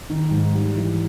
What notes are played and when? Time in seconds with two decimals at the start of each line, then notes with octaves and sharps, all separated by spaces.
0.10 D#3
0.31 G#2
0.54 G3
0.76 E3